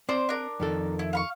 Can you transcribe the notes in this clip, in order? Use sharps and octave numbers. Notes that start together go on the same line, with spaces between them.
C4 C5 D5 D6
D4 A#4
F2 D#3 A4
E4
F5 B5 C#6